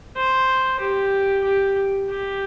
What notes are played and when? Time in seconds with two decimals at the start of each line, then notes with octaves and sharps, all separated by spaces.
0.16 C5
0.80 G4
1.44 G4
2.09 G4